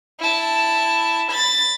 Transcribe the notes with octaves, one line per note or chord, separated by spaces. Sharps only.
E4 A5
B5 A6